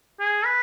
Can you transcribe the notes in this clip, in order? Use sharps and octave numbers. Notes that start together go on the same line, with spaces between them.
G#4
B4